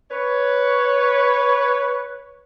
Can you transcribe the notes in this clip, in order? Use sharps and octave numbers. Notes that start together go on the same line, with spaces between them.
B4 C#5